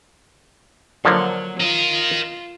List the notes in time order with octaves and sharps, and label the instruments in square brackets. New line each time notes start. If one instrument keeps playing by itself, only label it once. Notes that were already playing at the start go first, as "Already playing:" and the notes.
[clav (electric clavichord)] D3 F3 A#3 [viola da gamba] F#3
[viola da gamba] F4 [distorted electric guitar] A#4 D#5